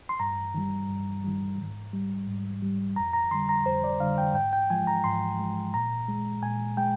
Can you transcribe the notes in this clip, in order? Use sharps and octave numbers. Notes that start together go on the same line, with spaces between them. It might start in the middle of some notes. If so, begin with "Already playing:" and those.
C6
G2 A#5
D#3 G3
G2
D#3 G3
G#2
G3
G#2
G3
F2 A#5
A#5
D3 G3 C6
A#5
F2 C5
D5
D3 G3 F5
G5
G#2 G5
G5
F3 G#3 G#5
A#5
G#2 C6
F3 G#3
A#2 A#5
G#3
A#2 G#5
G#3 G5